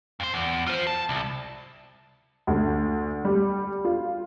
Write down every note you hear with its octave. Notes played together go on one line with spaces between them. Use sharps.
F2 C5
E2
F4 C5
A5
C2
D2
G3
F4